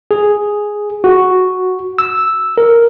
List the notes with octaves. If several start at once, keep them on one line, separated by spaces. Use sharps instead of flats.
G#4
F#4
E6
A#4